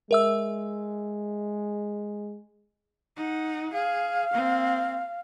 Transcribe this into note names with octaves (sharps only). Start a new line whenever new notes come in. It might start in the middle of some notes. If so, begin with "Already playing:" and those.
G#3 A#4 E5 E6
D#4 F#5
G#4 F5
A#3 C4